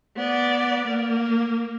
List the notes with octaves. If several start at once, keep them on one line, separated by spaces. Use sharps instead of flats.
B3 D5
A#3